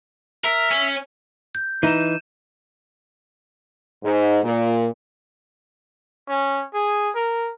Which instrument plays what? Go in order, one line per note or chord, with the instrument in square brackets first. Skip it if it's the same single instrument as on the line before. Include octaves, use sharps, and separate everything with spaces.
[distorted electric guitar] A#4 [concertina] E5
[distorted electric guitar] C#4
[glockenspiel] G6
[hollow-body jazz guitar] E3 D#4 [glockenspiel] D#7 E7
[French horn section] G#2
A#2
[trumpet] C#4
G#4
A#4